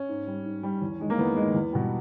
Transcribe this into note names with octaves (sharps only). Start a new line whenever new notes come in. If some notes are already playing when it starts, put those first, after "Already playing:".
Already playing: C#4
G#2
G3
G#2
G3
E2
D#3 G#3
A#3
E2 B3
D#3 G#3
E2
B2 G3